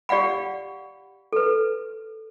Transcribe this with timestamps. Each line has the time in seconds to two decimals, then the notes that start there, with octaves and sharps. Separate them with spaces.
0.09 G4 D5 F5 F#5 B5
1.33 A4 B4